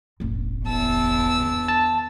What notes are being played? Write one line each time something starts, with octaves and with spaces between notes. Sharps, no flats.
E1 A1
E2 A5 E6
D#3 D4
A5